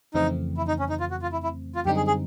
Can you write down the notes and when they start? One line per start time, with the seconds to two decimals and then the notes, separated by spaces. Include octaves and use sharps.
0.14 F2 C#3 E3 A3 C4 D#4
0.57 E4
0.68 D#4
0.79 C#4
0.89 D#4
1.00 F4
1.11 F#4
1.22 F4
1.32 E4
1.43 E4
1.75 F4
1.86 F#2 D3 G3 C4 D#4 G4
1.97 G#4
2.07 G#4